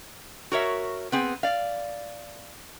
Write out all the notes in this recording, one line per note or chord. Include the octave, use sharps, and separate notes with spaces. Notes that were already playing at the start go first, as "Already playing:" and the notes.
F#4 A#4 C#5 E5
B3 C4 G#4
D5 F5